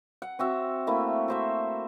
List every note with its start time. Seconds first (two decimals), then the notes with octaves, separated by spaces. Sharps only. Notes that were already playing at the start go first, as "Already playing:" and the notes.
0.22 F#5
0.39 C4 F#4 E5
0.87 A3 A#3 E4
1.28 F#4 C5 E5